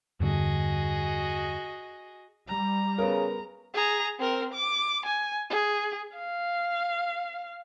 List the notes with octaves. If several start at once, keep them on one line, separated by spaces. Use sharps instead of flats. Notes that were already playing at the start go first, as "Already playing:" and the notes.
E2 G2 D3 F#4 G#4 D#5
G3 A#5
C#3 B3 A#4
G#4 A#5
C4 A#4
D6
G#5
G#4
F5